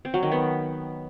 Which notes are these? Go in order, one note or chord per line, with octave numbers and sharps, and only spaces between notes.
C4
F#3
D#3
B3